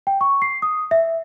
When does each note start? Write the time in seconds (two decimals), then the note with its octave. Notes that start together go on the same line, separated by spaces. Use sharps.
0.07 G5
0.21 C#6
0.42 C7
0.62 D#6
0.91 E5